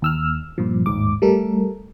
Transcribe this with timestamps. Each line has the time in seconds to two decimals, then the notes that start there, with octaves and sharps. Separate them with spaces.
0.02 D#2 E6 F6
0.58 G2 A#2 F3
0.86 A1 D#2 G#2 D6
1.22 G3 A3 A4 A#4